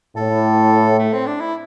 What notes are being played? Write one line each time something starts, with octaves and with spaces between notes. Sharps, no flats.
A2 A4
A3
C4
D4
E4